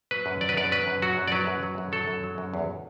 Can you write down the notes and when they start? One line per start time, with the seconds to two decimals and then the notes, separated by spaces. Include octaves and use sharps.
0.11 F#3 B4
0.26 F#2
0.41 F#3 D5
0.49 B4
0.57 F#2 D5
0.72 F#3 B4
0.87 F#2
1.02 F#3 F#4
1.17 F#2
1.28 D5
1.32 F#3 B4
1.47 F#2
1.63 F#3
1.78 F#2
1.92 F#3 A4
2.08 F#2
2.23 F#3
2.38 F#2
2.54 E2